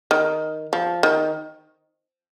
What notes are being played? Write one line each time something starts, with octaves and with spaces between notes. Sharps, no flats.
D#3
F3
D#3